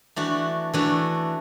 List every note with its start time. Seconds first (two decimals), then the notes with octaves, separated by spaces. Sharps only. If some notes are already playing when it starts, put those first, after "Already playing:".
0.16 E3 A3 D4 F#4
0.74 E3 A3 D4 F#4